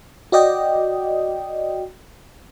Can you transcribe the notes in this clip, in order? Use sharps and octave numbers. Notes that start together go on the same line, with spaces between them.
F#4 D5 D#5 G5